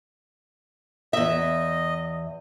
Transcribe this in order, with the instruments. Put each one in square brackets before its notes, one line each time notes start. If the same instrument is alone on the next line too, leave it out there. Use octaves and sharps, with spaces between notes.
[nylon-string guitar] E2 E5 [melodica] D#5